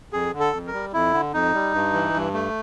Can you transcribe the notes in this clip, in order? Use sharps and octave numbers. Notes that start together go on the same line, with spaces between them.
F2 G#4
D3
A4
F2
A#4
G3
F2 E4
D3
F2 D#4
G3
G2
E3
G2
A3